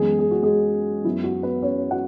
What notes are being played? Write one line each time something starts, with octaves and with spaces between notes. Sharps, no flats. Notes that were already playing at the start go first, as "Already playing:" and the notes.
Already playing: F#2 E3 G#3 B3 G#4
G#4
F#4
G#3 G#4
F#2 F#3 B3 E4
F#4
B3 B4
C#4 C#5
F#4 F#5